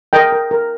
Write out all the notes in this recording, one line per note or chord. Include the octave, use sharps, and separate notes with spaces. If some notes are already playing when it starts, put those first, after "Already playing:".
A#4 D#5 G5
A#4
A#4